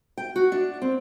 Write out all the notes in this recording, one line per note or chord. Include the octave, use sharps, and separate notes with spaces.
G5
F#4
D4
C4